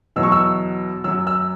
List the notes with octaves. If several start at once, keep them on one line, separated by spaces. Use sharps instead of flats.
E2 B2 F#3 E6
C#6
E6
F#2 F#3 E6
E6